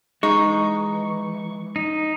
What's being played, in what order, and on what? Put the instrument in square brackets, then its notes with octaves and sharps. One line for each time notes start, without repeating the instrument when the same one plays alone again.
[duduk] E3 [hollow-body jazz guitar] G#3 [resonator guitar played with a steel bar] D#4 [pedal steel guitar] C#6
[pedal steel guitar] D#4